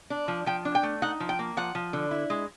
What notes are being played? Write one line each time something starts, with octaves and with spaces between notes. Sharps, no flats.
D4
F3
F3 G5
D4
G5
A3
D#4 F#5
F3
G5
A#3
F3 F#5
F3
D3
E4
G#3